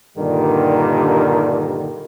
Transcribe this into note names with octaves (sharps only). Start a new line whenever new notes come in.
G2 A#2 D3 D#3 G3